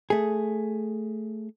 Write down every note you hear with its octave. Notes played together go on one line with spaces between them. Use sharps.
A3 G#4